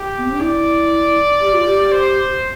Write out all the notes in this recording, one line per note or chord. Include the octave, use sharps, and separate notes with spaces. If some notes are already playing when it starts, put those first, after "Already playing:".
Already playing: G4
B3
C4
D4
E4 D5
G4
F4
G4
C5